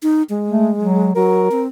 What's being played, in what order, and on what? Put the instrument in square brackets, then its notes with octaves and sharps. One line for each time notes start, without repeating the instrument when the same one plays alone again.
[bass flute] D#4
G#3
[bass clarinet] A3
F#3
[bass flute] F#3 [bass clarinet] A#4
[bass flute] C4